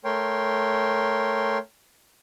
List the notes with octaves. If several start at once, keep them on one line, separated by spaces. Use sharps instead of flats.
A3 A#4 C#5 G5 C6